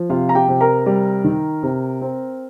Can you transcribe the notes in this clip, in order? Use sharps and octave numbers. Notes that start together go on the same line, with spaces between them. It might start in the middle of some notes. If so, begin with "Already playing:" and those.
Already playing: F3
C3 F4 F5
A#5
G4 G5
C3
A#4 A#5
G3
D#3
C3
C4